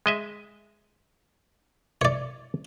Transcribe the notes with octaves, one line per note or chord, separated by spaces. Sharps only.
G#3 D#5 E5
C#5 D5